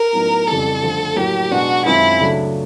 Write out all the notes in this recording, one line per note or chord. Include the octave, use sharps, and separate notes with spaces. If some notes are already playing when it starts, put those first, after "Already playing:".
Already playing: A#4
A2 F#3 B3 D#4
F2 C#3 E3 G3 A4
D3 F3 A3
A2 F#3 A#3 G4
B2 G#3 B3 D4 F#4
F#2 D#3 G#3 C4 E4 F4
C#2 C#3 F#3 A3 D4